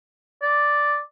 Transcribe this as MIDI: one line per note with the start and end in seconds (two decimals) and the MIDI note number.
0.42 0.99 74